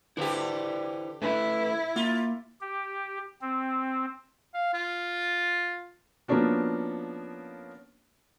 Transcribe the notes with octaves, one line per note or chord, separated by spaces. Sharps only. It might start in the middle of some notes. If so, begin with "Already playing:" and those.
D3 E4 G4 B4 C5
A3 E4 B4
A#3 F4
G4
C4
F5
F4
F3 A#3 B3 C#4 D4 F#4